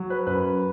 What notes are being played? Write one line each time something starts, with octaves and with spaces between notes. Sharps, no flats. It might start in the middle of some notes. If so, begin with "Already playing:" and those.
Already playing: F#3
B4
F#2 B4